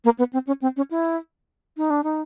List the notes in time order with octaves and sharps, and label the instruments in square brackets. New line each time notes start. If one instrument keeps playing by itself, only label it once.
[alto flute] A#3
B3
C4
C#4
C4
C#4
E4
D#4
D4
D#4